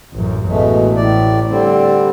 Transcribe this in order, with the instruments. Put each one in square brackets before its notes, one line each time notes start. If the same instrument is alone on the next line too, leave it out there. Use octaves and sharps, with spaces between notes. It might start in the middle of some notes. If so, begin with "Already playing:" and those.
[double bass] A1 F#2
[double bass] A1 [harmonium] B2 G#3 A3
[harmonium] A2 D5
D3 G3 C4